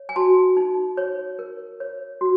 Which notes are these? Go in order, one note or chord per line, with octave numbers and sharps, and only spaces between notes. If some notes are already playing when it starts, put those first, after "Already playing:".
Already playing: C#5
G#5
F#4 A5
D#4
C#5
A#4
C#5
F#4